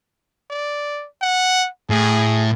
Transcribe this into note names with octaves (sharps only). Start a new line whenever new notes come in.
D5
F#5
A2 G#4